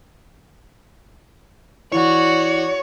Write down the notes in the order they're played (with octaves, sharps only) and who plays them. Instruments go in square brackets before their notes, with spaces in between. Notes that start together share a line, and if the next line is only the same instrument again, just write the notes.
[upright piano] E3 [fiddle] F#4 D5 [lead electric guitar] C#5